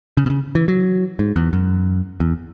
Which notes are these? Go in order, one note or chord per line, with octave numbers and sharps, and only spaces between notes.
C#3
B2
C#3
E3
F#3
G#2
E2
F#2
E2